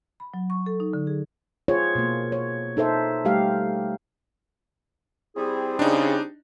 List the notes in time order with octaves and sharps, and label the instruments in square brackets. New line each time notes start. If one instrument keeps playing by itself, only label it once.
[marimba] B5
F#3
C#6
A4
D#4
D3
G#4
[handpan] F4 G#4 C5 C#5
B2 A#3
C#5
D#4 A4 C5 E5
G3 A3 G4 F5
[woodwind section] G3 E4 G#4 [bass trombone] C4
[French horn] C#3 [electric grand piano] D4 D#4